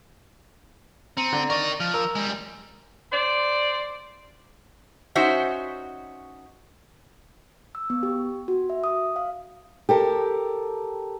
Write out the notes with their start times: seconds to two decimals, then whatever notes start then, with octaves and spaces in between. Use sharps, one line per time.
1.17 C4 A#5 C#7 D#7
1.33 D3 A#5
1.50 A#4 D5 D#5 C#6
1.80 F3 F6
1.94 A#4 E6
2.15 G3 G#3
3.12 C5 D5
5.15 C#4 D#4 F#4 C5 E5
7.75 E6
7.90 B3
8.03 G4
8.48 F#4
8.70 E5
8.84 D#6
9.16 F5
9.89 G4 A4 A#4